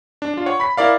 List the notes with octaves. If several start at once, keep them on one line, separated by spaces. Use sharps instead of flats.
D4
D4 F4
C#5 F#5
B5 B6
E4 A#4 D5 F5